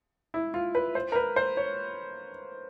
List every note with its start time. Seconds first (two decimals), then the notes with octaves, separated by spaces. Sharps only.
0.34 E4
0.54 F4
0.75 B4
0.95 C5
1.12 A#4
1.16 B4
1.36 C5
1.57 C#5